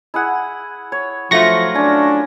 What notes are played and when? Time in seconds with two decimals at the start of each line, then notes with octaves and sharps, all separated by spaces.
0.14 E4 G#4 F#5
0.92 C#5
1.31 F3 F#3 A3 F4 C#6 A#6
1.75 C#4 D4